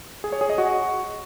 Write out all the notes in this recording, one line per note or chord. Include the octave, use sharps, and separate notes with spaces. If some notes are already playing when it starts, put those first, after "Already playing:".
G#4
C#5
G#4
D#5
F#4